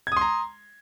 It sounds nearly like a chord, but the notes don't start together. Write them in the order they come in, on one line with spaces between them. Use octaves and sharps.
G#6 D#6 C6 A#5